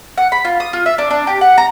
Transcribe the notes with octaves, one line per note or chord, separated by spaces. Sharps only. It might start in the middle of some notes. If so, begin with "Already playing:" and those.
F#5
B5
F4
D#6
F4
E5
D4
D4
G4
F#5
A#5